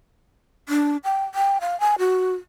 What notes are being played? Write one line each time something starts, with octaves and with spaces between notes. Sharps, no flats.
D4
G5
G5
F5
G#5
F#4